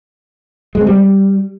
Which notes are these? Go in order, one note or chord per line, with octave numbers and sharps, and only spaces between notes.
G#3
C4
G3